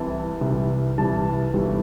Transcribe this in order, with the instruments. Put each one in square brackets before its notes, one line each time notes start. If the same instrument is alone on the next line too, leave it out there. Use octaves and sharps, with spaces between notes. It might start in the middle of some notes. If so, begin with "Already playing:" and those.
Already playing: [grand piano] C2 C3 E3 A5
C2 C3 E3 G3
C2 C3 E3 G3 A5
G1 G2 E3 G3